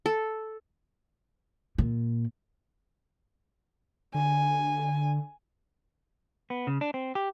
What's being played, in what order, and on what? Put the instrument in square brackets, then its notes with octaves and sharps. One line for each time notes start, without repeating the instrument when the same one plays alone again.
[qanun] A4
[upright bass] A#2
[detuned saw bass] D3 [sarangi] G#5
[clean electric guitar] B3
C#3
D4
C4
G4